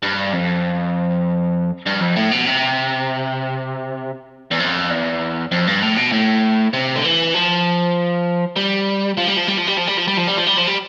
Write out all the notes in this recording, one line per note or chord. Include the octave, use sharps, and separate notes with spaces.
G2
F2
G2
F2
A2
B2
C3
E2
F2
E2
F2
G2
A2
B2
A2
C3
D3
E3
F3
G3
F3
G3
F3
G3
F3
G3
F3
G3
F3
G3
F3
G3
F3
G3
F3
G3